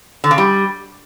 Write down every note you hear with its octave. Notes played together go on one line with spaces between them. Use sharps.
D3
C#3
G3